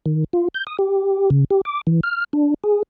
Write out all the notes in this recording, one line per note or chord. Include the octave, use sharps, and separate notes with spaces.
D#3
F4
G6
D#6
G4
C#3
G4
D6
E3
F6
D4
G#4